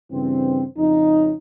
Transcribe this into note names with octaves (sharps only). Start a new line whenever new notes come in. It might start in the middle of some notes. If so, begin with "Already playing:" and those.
G2 C#3 E3 C4
F2 C#3 D#4